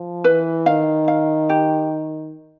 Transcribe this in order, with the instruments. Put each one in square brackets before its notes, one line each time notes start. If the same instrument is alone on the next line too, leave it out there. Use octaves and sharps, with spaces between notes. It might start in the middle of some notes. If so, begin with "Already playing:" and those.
Already playing: [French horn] F3
[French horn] E3 [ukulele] B4
[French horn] D#3 [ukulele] F5
[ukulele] F5
G4